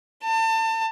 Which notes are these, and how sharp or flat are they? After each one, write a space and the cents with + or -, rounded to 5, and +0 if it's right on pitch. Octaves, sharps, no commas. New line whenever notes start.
A5 +30